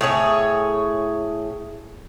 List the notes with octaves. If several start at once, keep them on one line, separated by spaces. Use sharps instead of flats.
A2 G#4 C#5